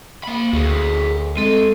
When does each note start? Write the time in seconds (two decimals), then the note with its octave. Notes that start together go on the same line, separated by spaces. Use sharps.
0.24 A#3 B5
0.53 D2 F#4 G#4
1.37 G#3 C4 A4